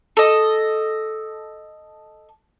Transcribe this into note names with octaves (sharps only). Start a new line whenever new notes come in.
A4 D#5